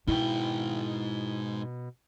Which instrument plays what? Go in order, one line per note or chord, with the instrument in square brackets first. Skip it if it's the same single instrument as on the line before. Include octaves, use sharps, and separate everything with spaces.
[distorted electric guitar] G#2 G5 [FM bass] B2 [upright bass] E4